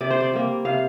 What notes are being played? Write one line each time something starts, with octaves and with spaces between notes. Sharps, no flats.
C3 D5
C5
D5
G3 A#3
C3 F5